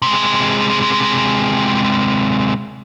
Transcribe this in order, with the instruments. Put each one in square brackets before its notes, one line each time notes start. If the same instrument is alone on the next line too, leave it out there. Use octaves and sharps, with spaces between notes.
[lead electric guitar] C3 G#3